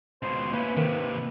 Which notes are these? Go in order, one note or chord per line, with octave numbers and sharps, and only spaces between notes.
C#2 B2 C5
A#3 C#4 E4 B4
D#2 C3 D#3